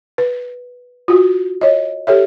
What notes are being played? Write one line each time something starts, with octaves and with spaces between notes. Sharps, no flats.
B4
F4 F#4
C#5 D#5
G4 A4 C#5 E5